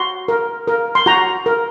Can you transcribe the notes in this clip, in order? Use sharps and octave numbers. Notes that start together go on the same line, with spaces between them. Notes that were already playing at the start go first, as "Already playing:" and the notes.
Already playing: F#4 C6
A#4
A#4
C6
F#4 A#5
A#4